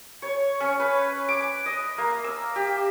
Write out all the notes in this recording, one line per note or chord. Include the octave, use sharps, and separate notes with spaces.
C#5
C#4
B4
D6
D#5
A#3
E6
G4